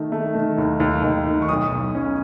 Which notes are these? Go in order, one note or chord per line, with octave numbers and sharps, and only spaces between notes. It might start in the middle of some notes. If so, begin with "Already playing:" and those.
Already playing: D#3 A3
A3
D#3
D#2
D#2
D#2
D#3
C#6
B1 D#6
B1
C#4